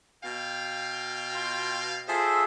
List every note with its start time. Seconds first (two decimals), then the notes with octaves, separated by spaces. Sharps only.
0.24 B2 F5 G5
1.34 F4
2.08 F4 G#4 A4 C5 E5 G5